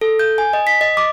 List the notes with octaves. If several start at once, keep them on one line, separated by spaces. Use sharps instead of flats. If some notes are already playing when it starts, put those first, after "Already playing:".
A4
G6
G#5
D#5
B6
D#5
D6